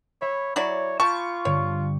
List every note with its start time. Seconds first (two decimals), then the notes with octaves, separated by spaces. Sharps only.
0.21 C#5 E5 B5
0.56 F#3 E4 C#5 D5
1.00 F4 A5 B5 C#6 D6 G6
1.45 G2 D3 C4 C#5